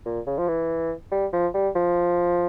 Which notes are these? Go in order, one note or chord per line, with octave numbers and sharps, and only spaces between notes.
A#2
C#3
F3
E3
G3
F3
G3
F3